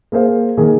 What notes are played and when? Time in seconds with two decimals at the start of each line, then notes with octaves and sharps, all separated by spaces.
0.12 A#3 G#4 C5 F5
0.57 D#3 A#3 G#4